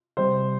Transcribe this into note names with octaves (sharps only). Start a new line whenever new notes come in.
C3 G3 C4 C5